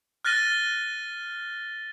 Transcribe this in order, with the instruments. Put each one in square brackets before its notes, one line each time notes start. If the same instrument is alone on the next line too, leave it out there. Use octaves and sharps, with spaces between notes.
[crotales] F6 F#6 A6 A#6 D#7 G7